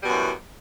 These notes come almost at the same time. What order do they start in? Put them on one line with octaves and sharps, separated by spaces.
G3 B2 F#2 E3